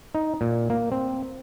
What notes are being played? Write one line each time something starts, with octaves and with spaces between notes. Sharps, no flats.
D#4
A#2
A#3
C4